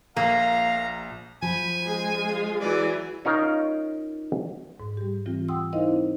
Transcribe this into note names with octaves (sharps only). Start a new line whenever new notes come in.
A#1 A#3 F5 A#5
F3 G#5 B5
G#3 G#4
F4
E3 F#3 D5 G#5
C#4 D#4 F4 A#4
G#2
G3 G4
E3 G3 C4 F4
F#5 G5 C6 D#6 E6
D#4 E4 A#4 C5 D#5 F5
C4